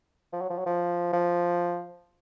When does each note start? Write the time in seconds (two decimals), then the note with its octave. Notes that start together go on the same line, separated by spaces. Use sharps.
0.33 F3
0.41 F#3
0.50 F3
0.58 F#3
0.66 F3
1.13 F3